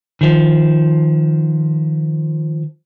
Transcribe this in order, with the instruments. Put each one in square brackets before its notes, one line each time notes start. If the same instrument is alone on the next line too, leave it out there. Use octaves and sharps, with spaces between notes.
[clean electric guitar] D#3 F3